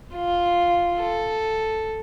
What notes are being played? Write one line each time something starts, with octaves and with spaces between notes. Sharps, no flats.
F4
A4